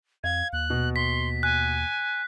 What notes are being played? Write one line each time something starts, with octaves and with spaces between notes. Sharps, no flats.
F2 F5 G#6
D#2 F#6
B2
C6 B6
G#5 F#6